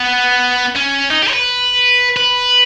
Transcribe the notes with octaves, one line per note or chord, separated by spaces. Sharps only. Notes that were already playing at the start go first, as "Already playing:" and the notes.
Already playing: B3
C#4
D#4
G4
C#5
B4
B4